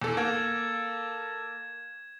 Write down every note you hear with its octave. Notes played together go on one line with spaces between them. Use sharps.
E2 A4
A#3 A4 G#6 E7